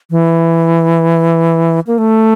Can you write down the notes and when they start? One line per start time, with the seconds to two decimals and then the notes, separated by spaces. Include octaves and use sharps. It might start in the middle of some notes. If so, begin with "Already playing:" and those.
0.11 E3
1.87 A#3
1.98 A3